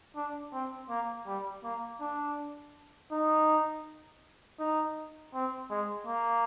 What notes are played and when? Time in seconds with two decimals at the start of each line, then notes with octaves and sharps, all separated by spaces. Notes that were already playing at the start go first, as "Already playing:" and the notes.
0.16 D4
0.53 C4
0.90 A#3
1.27 G3
1.64 A#3
2.01 D4
3.11 D#4
4.59 D#4
5.34 C4
5.70 G#3
6.07 A#3